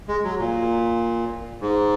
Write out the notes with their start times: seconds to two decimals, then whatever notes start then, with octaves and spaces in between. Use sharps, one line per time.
0.08 G#3
0.24 F#3
0.39 A#2
1.61 G#2